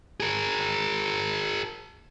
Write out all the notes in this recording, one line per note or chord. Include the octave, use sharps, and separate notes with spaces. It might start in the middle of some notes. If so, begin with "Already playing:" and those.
G#4 A#4